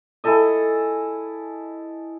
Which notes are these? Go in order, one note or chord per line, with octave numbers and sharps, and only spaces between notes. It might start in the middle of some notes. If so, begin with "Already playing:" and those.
E4 G#4 A4 D#5